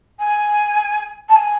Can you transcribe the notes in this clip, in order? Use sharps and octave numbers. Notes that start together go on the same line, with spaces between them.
G#5
A5
G#5